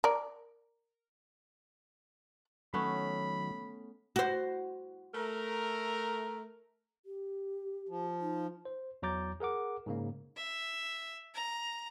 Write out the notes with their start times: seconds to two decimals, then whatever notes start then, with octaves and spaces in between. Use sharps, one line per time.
0.04 A#4 D5
2.74 D#3 F#3 A3 B3 C#4 B5
4.16 F#4 C5
5.14 A3 A#4
7.06 G4
7.89 F3
8.21 D#4
8.65 C5
9.02 E2 F#3 A#5 D6 G6 A6
9.40 G#4 A#4 F#5 D6
9.86 G#2 C#3 A#3
10.36 E5
11.34 A#5